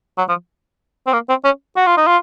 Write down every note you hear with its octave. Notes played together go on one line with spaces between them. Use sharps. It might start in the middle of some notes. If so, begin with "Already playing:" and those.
F#3
F3
C4
A#3
C4
C#4
F#4
F4
D#4
F4